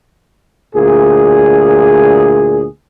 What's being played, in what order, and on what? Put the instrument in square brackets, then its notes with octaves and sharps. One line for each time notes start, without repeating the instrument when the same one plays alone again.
[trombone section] D2 A#2 G#4